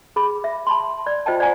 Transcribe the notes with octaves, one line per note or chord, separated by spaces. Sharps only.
G#4 B5
E5
A5 B5 C6
D5
F4 C5 D#5 G5 A5
D5 F#5 G#5 A#5